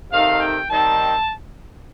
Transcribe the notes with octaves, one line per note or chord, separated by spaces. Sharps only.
C3 D#3 A3 D#4 F5
G5
D#3 G3 C4 D#4 A5